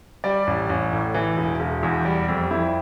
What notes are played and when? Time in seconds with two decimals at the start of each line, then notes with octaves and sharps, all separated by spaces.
0.24 G3 D5
0.47 A1
0.70 A1
0.93 A2
1.14 E3
1.37 E1
1.60 E1
1.83 E2
2.05 G3 D5
2.28 F2
2.50 F2 E4